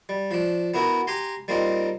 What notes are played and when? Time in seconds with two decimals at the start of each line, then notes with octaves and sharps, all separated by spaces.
0.09 G3
0.31 F3 D4
0.74 B3 E4 F#4 A#4
1.07 G4 G#5 A#5 C6
1.48 G3 A#3 C4 D#4 F4